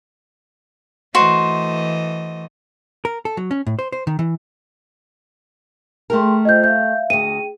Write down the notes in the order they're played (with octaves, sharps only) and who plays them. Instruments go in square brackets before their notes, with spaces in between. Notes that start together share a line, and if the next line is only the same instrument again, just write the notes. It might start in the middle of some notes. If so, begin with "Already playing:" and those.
[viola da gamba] E3 A3 D#5 [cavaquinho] F#4 C5
[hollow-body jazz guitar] A#4
A4
F#3
C#4
A2
C5
C5
D#3
E3
[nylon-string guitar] A3 G4 A#4 [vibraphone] G#4 G5 C6
[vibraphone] F4 C5 G5 [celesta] D#5 G6
[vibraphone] E5 F5 [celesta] G6
[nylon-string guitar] D2 D#5 [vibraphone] G#4 G5 [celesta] D#7